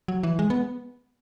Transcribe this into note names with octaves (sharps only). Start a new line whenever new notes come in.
F#3
E3
G#3
B3